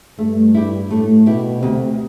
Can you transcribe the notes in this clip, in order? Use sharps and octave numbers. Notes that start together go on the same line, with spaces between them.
G2 A3
E4 G4
A2 A3
B2 E4 G4
D2 C3